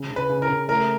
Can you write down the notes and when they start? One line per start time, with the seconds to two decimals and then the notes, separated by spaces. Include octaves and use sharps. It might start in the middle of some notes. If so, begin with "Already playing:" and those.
Already playing: C#3
0.11 C#3
0.16 B4
0.29 C#3
0.42 A#4
0.49 C#3
0.68 A3 A#4